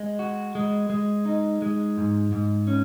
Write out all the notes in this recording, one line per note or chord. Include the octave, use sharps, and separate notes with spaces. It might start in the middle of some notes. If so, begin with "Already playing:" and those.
Already playing: G#3
F#4
G#3
G#3
D#4
G#3
G#2
G#2
C#4